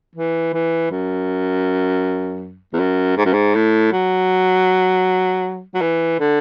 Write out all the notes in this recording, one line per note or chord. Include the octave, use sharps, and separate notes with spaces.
E3
E3
F#2
E2
F#2
G#2
F#2
G#2
A2
F#3
F#3
E3
D3